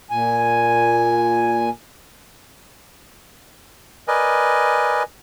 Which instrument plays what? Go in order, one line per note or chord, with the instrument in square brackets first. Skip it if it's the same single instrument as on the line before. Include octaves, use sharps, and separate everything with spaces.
[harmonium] A#2 G#5
[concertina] A#4 B4 D5 D#5 G#5